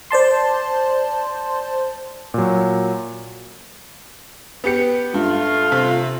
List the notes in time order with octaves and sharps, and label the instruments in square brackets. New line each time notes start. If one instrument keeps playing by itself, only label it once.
[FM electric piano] C5 D5 A5 C6
[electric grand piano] A#2 F#3
[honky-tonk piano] B3 G4 C#7
[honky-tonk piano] G2 [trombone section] A3 F4
[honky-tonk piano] C3